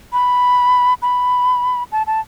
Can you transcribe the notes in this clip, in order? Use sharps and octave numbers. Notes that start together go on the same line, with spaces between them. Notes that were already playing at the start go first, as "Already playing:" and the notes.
B5
B5
A5
A5